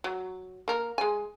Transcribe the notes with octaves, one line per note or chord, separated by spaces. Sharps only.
F#3
A#3 A#4
G#3 G#5